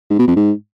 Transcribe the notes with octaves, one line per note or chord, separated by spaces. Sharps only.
G#2
B2
F2
G#2